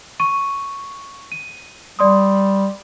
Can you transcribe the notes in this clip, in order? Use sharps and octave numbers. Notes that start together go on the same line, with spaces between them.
C#6 D#7
D#7
G3 D5 C6 D#6